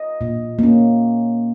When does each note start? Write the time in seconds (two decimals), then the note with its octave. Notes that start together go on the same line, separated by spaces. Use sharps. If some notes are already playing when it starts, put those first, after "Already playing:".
Already playing: D#5
0.21 A#2
0.59 A#3 C#4